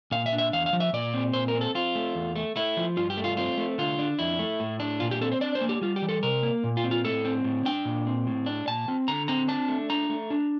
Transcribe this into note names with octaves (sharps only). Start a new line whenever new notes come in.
A#2 F5
E5
D4
E5
E2 F5
F5
F3
E5
A#2 D5
C4
A#2 C5
A#4
C4
A4
C4 F4
A3
E2
A3
A3 E4
F3
G2 F4
G4
A3
F4
C4 F4
A3
D3 F4
D4
F2 E4
A3
A2
D4
A#2 F4
G4
C4 A4
C5
D4 D5
C5
A#3
G4
G3 F4
G4
E3
A4
C3 A#4
A#3
A#2
F4
C4
F4
A2 A4
C4
A2
D4 G5
A#2
C4
A2
D4
A#2 A5
C4
D3 A#5
C4 A#5
D4 A5
A3
D4 A#5
A3
D4